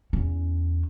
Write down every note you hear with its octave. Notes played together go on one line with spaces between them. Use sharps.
E2 C#4